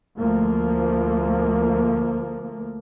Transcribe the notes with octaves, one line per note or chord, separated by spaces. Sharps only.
D2 F3 A3 A#3